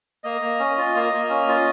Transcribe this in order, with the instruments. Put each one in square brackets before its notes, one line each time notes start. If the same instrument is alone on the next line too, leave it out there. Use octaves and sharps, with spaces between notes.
[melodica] A#3 D#5
A#3
C#4
F4
A#3
A#3
C#4
F4